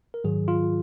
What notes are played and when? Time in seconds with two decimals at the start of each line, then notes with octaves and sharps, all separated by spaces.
0.14 A#4
0.24 G#2 D#3 F#3 G#4
0.48 F4